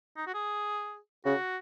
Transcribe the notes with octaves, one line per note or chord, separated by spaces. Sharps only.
D#4
F#4
G#4
C#3 F#4